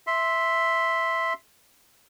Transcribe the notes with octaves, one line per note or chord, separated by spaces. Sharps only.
E5 C6